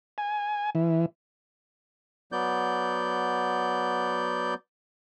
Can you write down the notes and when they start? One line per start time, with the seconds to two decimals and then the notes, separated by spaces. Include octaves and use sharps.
0.18 G#5
0.75 E3
2.32 F#3 B3 D5 G6